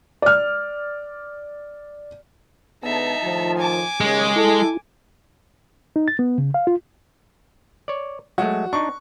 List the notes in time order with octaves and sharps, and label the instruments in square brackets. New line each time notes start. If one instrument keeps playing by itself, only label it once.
[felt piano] D5 F6
[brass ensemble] D3 G#3 B3 [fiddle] D#4 E5 [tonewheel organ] A5
[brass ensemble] A2 D#3 F3
[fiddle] G#5 D6
[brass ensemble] D#2 C#3 [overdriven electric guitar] G#3
[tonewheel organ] E4 [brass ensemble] A4
[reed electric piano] D#4
A6
B3
C#3
F5
F4
[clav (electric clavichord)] C#5 D5
[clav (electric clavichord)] F#3 G#3 A3 [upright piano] F#4
[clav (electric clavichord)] D4 D#4 [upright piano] C#6